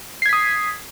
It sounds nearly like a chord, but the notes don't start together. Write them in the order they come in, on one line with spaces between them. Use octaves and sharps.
C7 G#6 B6 D#6